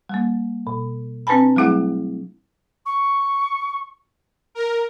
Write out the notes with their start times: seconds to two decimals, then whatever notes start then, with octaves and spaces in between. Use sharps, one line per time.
0.09 G3 A#3
0.67 B2
1.27 C4 D4 B4 G#5 A5 B5
1.56 F#3 G3 A3 E4 G#4 F#5
2.85 C#6
4.55 A#4